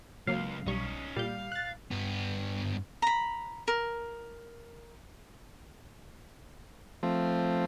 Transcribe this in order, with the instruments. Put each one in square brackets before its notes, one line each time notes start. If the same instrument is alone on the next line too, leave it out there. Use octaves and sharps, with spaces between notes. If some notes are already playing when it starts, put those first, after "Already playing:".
[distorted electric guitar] C#2 [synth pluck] F#3 A#3 [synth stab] F5
[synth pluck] B1 G3 C#6 [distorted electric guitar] C#4 D#4
[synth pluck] A#2 G6 [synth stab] G3 [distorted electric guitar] F5
[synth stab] F#6 A6
[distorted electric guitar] G2 B3
[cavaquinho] A#5 B5
A#4
[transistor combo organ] F3 A3 C4